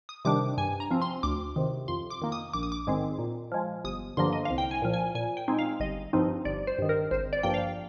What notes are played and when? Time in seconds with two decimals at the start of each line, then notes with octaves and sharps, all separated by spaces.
0.09 D#6
0.25 C3 D#3 G3 D4 D6
0.58 G2 G#5
0.80 A#5
0.91 F3 C4
1.02 C6
1.23 D2 D6
1.56 C3 D#3
1.88 F2 C6
2.10 D6
2.22 D#3 A#3
2.32 D#6
2.53 A#1 D6
2.63 D#6
2.72 D6
2.87 G#2 D#3 G#3 C4
3.19 A#2
3.52 F3 G#3
3.84 G1 D#6
4.17 G2 D3 F3 A#3 C6
4.33 D#5
4.45 C2 F5
4.58 G5
4.71 G#5
4.82 A#2 F3
4.94 G#5
5.15 A#2 G#5
5.37 G5
5.48 G#3 C4 D#4
5.59 F5
5.80 G1 D#5
6.13 G2 F3 C4 D#4
6.45 G1 D5
6.67 C5
6.78 G2 D#3
6.89 A#4
7.11 G#1 C5
7.33 D5
7.43 G2 F3 A#3 G5
7.54 F5